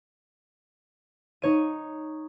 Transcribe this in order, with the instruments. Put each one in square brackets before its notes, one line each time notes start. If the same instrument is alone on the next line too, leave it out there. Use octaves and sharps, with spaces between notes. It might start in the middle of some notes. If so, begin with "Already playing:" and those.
[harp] D#4 C#5 D#7